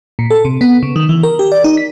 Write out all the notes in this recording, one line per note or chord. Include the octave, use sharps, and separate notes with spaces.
A#2
A4
C3
B3
C#3
D#3
E3
A#4
G4
D5
D#4
B6